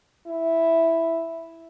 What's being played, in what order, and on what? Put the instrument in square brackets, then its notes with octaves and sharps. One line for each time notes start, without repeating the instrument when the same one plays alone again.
[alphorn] E4